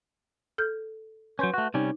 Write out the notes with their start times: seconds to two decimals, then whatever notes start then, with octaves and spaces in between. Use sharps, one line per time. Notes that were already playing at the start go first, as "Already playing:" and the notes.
0.58 A4 F6 G6
1.39 F#3 C#4 B4 C6 G6
1.54 A3 F#4
1.74 C3 G3 C#4 D#4